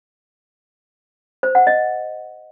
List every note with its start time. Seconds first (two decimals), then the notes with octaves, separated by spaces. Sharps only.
1.43 C5
1.55 F#5
1.67 D#5